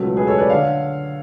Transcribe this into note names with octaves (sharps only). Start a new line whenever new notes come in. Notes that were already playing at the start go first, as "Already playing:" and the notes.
Already playing: C#2 B2 F#3 A3 B4
G#4 B4
A4 C#5
B4 D5
D3 C#5 F5